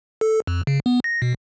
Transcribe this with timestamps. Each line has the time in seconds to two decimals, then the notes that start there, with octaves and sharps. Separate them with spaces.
0.21 A4
0.47 F2
0.67 C#3
0.86 B3
1.04 A#6
1.22 B2